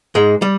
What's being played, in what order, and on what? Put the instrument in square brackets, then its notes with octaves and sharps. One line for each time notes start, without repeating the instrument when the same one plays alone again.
[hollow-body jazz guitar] G#2 G#3
G3